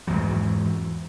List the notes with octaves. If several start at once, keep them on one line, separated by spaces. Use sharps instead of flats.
E2 G#2 E3 F#3